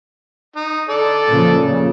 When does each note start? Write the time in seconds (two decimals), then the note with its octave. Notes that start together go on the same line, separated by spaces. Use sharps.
0.56 D#4
0.89 A4 D5
1.28 A#2 C#3 F3
1.59 A#2 C#3